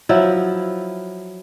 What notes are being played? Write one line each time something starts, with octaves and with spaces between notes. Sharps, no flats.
F3 F#3 E4